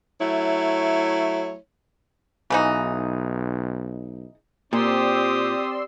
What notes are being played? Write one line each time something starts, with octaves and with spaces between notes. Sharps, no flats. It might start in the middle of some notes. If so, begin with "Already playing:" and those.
F#3 A3 E4 C#5
B1 C#3 E3 D#4
A#2 C4 G4 D5 C6 D#6 E6